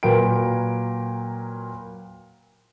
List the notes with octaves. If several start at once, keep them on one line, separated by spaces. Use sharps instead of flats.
A#2 F#3 A#4 B4 G5 D7